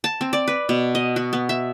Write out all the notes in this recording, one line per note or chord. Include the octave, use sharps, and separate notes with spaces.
A5
C4
D5
B4
B2
D#5
F#4
B3
E5